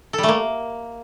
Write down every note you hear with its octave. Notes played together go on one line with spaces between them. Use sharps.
A4
G3
A3
A#3